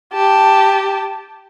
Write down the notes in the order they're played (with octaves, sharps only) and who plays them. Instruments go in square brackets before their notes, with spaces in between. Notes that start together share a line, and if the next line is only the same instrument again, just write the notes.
[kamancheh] G4 A5